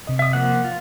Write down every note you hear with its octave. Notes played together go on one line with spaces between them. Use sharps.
C3 D#5
E5 D#6
F3 A#3 F#5
F4